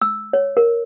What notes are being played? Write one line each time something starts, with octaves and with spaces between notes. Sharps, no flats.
E6
C#5
A#4